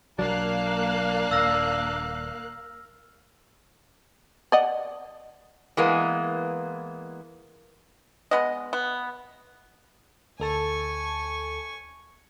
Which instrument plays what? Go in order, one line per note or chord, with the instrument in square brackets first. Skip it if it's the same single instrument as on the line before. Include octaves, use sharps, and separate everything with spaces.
[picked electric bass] B1 F#3 [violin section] A#3 F5 F#6 [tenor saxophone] D4
[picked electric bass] D#1 [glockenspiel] E6 F6 A#6
[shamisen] D5 D#5 F#5
[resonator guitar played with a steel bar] E3 G#3 A#3 B3
[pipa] G#3 B3 D#5
B3
[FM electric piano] D2 A4 A5 [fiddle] G#5 C#6